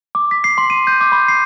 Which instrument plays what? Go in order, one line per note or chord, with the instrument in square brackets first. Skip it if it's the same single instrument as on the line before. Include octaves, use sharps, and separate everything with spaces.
[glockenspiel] D6
B6
C7
C6
D#7
G6
D6
B5
C7